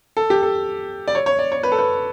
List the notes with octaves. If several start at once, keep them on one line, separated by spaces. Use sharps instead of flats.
A4
G4
A4
D5
C#5
C#5
D5
C#5
B4
A4
B4